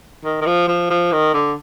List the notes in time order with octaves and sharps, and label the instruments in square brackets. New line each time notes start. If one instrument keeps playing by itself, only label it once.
[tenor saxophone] D#3
D#3
F3
F3
F3
D#3
D3